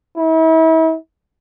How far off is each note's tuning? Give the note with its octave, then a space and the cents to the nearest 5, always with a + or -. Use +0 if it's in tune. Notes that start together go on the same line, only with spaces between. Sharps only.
E4 -40